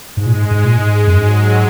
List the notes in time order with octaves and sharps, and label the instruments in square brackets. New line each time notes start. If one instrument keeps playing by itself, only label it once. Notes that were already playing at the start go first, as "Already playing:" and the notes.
[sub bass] G#2 [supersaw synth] G#3
[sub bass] A#2
G#2
G#2
A#2
G#2
[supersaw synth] G#3
[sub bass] F#2
[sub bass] G#2 [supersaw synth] F#3